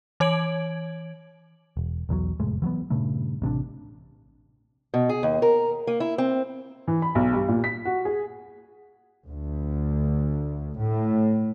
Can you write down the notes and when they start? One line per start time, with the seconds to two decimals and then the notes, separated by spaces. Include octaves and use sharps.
0.20 E3 C#5 G#6 D7 F#7
1.77 E1
2.09 B1 E2 F3 F#3
2.40 F1 A2 G#3
2.62 E3 F#3 A#3 B3
2.90 G2 A#2 C#3 A3
3.42 A1 C3 D#3 D4
4.94 B2
5.09 G#4
5.23 D#2
5.42 A#4
5.87 A#3
6.00 E4
6.18 C4
6.88 E3
7.02 B5
7.15 B1
7.33 G2
7.48 A#2
7.64 B6
7.85 F#4
8.05 G#4
9.28 D2
10.77 A2